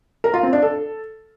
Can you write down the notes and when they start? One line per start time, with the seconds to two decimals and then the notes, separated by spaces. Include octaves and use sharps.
0.24 A#4
0.34 F4
0.43 C4
0.53 D4
0.62 A4